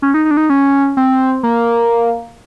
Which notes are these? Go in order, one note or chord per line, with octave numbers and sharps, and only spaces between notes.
C#4
D#4
D#4
D4
D#4
C#4
C4
A#3